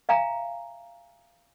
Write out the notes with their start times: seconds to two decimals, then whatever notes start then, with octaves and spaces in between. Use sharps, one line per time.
0.09 E5 F5 G#5 A#5